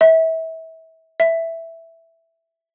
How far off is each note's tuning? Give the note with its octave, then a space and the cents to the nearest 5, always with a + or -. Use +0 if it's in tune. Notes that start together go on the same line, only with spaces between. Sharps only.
E5 -30
E5 +0